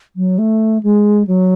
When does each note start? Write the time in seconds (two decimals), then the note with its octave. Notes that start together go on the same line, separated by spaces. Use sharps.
0.16 F#3
0.38 A3
0.83 G#3
1.27 F#3